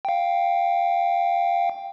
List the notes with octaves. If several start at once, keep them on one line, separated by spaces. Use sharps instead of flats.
F5 G5